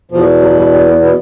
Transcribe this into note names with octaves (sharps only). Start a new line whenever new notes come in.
E2 B2 F3
F#2 F#3
G2 G3
G2 G3
B2 B3
B2 B3